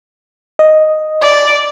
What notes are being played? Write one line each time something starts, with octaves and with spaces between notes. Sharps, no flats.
D#5
D5